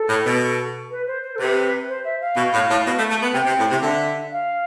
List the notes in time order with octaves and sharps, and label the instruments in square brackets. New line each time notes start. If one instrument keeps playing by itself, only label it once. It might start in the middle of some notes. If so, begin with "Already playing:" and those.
Already playing: [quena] A4
[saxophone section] A2
B2
[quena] B4
C5
C5
A4
[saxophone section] C3 [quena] B4
[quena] C5
E5
F5
[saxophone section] B2
A2
A2
B2
A3
A3
B3
[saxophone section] C3 [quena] G5
[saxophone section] C3
A2
C3
[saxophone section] D3 [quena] E5
[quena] F5